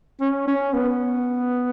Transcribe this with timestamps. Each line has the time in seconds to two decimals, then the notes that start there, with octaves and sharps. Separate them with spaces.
0.21 C#4
0.47 C#4
0.74 B3